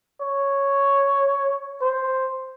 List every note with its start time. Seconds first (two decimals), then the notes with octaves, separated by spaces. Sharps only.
0.21 C#5
1.82 C5